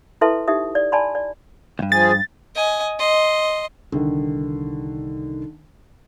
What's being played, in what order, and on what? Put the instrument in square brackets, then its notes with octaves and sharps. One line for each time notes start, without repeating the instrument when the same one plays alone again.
[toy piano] E4 A4 B4 E5 A5 C6
D#4 G4 E5 D#6
D5
D5 G#5 A5 B5 C6
D5
[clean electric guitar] D2 G2
[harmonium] F3 G#4 [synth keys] A6
[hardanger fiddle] D#5 G#5
D#5 C6
[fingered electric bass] C2 [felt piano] D3 D#3